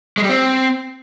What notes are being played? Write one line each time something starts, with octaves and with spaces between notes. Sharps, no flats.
G#3
G3
C4